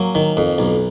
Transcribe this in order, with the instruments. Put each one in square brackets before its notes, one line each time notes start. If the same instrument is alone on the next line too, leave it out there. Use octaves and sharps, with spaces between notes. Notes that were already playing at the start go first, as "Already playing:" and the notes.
Already playing: [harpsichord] F#3 A#3 C#4
D#3
F2
B1